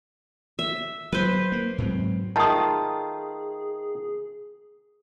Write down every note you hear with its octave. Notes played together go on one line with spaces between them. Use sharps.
E5
F#3 B4 C5
A#3
G#2 F#3 C4
D#3 A3 F4 G#4 A5 D#6